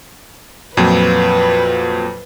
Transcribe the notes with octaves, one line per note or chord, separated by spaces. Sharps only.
F2 A#2 F#3 B4